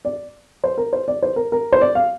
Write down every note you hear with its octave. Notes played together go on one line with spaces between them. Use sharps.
D5
C5
A#4
C5
D5
C5
A#4
A#4
C5
D5
F5